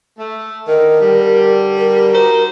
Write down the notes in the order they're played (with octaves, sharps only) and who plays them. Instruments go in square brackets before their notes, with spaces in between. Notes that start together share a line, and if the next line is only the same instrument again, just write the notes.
[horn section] A3
[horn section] D3 D#3 [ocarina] A#4
[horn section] D3 G3
[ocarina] A#4
[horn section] D#4 F#4 C5